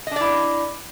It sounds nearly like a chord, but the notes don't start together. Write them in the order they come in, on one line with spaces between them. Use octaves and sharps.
D#5 D4 D5 E4